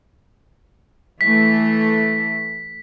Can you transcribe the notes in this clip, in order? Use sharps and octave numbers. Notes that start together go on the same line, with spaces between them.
E3 A3 B6